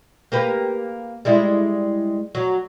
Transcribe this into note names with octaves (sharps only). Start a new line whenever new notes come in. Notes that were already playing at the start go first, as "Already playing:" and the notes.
A#3 G4 B4
G3 G#3 E4
F#3